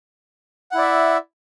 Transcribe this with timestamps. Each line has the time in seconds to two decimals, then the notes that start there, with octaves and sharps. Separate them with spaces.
0.71 F#5
0.75 E4
0.78 D5
0.81 E5